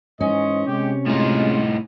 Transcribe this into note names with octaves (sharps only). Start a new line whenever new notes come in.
G#2 E3 C#4 C5 D#5
C3 G#3 G4
A2 G#3 D#4 F4